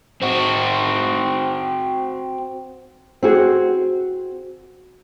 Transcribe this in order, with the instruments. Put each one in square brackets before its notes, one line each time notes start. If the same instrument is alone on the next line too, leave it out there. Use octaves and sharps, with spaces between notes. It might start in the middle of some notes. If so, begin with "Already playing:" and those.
[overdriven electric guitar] C4 F#4
[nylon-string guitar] C4 F#4 G#4